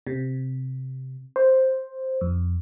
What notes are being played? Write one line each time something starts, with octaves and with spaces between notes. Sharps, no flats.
C3
C5
F2